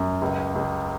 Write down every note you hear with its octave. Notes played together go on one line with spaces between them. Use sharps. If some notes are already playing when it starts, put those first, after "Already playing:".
Already playing: F#2
C#2
C#2